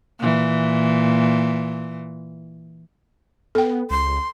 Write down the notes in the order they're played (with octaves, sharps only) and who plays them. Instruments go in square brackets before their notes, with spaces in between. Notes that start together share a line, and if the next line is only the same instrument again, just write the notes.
[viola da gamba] A#2 E3
[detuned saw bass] B3 [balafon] A4 G5
[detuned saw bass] C#2 [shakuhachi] C6